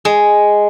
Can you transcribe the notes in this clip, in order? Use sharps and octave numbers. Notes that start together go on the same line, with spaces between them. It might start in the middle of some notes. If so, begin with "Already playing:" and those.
G#3